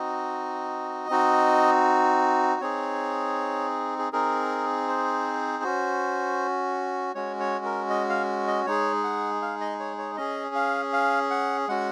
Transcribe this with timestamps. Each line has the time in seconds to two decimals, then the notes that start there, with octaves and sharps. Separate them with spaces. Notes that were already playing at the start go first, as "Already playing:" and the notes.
Already playing: C4 D#4 F#4 D#5
1.10 C4 D#4 F#4
2.61 C4 D#4 G#4 C#5
3.99 G#4
4.13 C4 D#4 G#4 A#4
4.88 C5
5.64 C#4 F#4
7.15 G#3 C#4 F#4 C#5
7.40 C#5
7.65 A#4
7.90 D#5
8.09 F5
8.47 D#5
8.66 G#3 D#4 G#4 C#5
9.04 F#5
9.42 F5
9.61 D#5
9.79 C#5
9.98 C#5
10.17 C#4 G#4 D#5
10.55 F5
10.93 F5
11.31 F#5
11.68 G#3 C#4 F#4 F#5